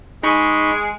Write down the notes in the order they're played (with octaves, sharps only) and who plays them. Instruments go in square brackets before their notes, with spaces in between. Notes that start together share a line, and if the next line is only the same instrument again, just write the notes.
[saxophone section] G#3 G#4 [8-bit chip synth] D#4 B5 C#6